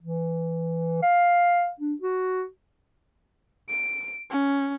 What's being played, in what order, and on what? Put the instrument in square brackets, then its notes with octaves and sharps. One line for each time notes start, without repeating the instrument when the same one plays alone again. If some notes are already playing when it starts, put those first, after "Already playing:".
[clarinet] E3
F5
D4
F#4
[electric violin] D7
C#4